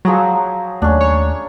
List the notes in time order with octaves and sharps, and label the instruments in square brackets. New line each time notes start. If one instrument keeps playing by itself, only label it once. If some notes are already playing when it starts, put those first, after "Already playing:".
[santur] F3 G#4 A#5 [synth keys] F#3
[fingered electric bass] D#2 A3 [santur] C#4 D4
[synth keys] C#5